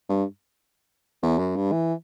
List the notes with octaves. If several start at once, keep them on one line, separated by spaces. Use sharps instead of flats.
G2
E2
F#2
G2
E3